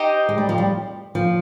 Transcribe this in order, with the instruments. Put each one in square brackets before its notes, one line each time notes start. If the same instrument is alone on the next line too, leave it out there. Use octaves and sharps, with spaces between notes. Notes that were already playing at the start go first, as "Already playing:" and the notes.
Already playing: [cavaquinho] D#4 G4 C5 D#5
[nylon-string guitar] G#3
G3
F3
G3
F3